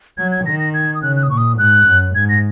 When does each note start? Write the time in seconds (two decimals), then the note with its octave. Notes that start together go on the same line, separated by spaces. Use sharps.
0.17 F#3 G#6
0.32 G#6
0.45 D#3 A#6
0.59 A#6
0.74 G#6
0.95 D#6
1.02 C#3 F#6
1.16 F#6
1.23 D#6
1.30 A#2 C#6
1.38 D#6
1.58 G#2 F#6
1.87 F#2
2.15 G#2 G#6
2.29 A#6